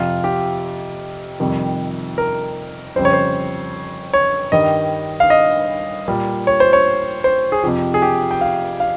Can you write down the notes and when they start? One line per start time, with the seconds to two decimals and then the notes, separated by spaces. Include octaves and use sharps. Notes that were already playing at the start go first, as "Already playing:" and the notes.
Already playing: F2 C3 F3 F4
0.24 G4
1.40 F2 C3 D#3 G3
2.18 A#4
2.95 F2 C#3 G3 C5
3.05 C#5
3.13 C5
4.13 C#5
4.52 G2 D#3 G3 D#5
5.20 F5
5.30 D#5
6.08 A#2 G3
6.47 C#5
6.60 C5
6.73 C#5
7.24 C5
7.52 G#4
7.64 F2 C3 F3 G4
7.94 G#4
8.02 G4
8.31 G5
8.41 F5
8.80 F5